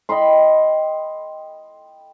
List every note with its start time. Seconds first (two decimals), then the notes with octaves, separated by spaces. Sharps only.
0.09 D#5 G5 B5 C6